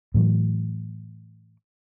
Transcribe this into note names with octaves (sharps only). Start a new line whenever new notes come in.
A2 E3 F#3